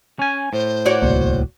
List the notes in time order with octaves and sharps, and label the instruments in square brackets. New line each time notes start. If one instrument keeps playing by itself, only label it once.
[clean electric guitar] C#4 G#5
[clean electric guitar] A2 [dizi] C5
[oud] F#4 C#5 D5
[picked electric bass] D1 C2 A#3